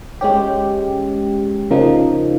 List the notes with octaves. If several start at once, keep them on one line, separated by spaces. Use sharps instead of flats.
G#3 C#4 G4
C#3 F3 A#3 D#4